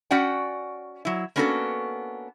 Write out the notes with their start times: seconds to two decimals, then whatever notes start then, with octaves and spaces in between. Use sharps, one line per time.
0.11 C#4 F#4 D5 F#5 G5
1.05 F#3 E4
1.36 A#3 B3 C#4 D4 F#4 A4